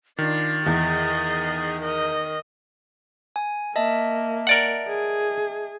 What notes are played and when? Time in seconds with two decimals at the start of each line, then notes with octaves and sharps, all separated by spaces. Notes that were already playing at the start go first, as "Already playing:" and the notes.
0.19 D#3 D4 F4 A6
0.66 E2 G#4 D#5
1.82 A#4 D#5
3.36 G#5
3.76 A#3 D#5 E5 A5
4.47 A#4 D5 F#5
4.88 G#4